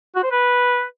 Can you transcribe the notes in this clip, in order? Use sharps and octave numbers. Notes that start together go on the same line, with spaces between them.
F#4
C5
B4